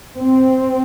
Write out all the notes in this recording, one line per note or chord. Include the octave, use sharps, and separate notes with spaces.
C4